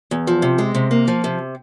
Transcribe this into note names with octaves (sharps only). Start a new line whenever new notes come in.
E2
F3
C3
G#3
C3
A#3
F3
C3